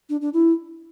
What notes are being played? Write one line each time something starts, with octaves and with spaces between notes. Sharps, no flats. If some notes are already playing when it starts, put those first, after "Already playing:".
D4
D4
E4